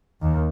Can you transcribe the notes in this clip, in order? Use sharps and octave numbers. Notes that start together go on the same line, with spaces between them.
D#2